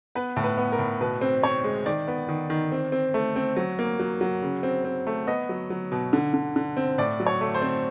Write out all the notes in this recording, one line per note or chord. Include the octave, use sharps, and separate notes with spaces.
B3 B4
A2
B4
B3
A#4
A2
B2 B4
C4
C4 C#5
G#3
D#3 D5
B3
D#3
D#3
C4
C4
A3
C4
F#3
A#3
F#3
F#3
C#3
C4
C4
A3
B3 D#5
F#3
F#3
B2
D3
D3
D3
C4
A2 D5
F#3
C#5
A3
C5
C4